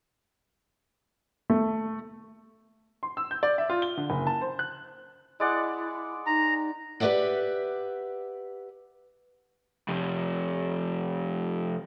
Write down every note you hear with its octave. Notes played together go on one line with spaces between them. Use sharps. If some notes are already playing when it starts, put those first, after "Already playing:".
A3
C6
E6
G6
D5
E5
F4
G7
D3
F#1
A5
C5
F#6
G#3 E4 D5 F#5
D#4 A#5
G4 B4 C#5 D5 E5 F#5
F2 C3